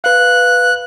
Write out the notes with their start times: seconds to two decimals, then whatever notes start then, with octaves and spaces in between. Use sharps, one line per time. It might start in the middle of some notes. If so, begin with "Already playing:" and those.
0.04 B4 F5 F#6